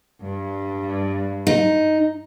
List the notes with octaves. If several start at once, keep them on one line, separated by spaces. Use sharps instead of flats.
G2
D#4